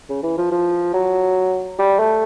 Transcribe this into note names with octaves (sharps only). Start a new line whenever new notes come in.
C#3
E3
F3
F3
F#3
G3
A3